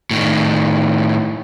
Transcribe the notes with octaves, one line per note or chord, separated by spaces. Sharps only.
A2 D#3